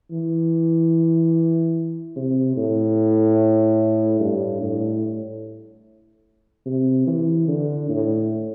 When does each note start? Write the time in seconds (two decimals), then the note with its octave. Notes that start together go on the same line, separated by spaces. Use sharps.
0.11 E3
2.16 C3
2.57 A2
4.20 G2
4.62 A2
6.66 C3
7.07 E3
7.48 D3
7.89 A2